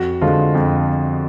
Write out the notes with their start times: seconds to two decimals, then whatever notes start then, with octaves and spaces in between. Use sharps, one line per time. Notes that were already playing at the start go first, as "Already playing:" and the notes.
Already playing: F2 F#4
0.22 D3 F3 G#3 F4
0.54 F2